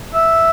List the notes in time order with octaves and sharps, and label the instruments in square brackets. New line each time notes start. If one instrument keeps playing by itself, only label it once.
[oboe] E5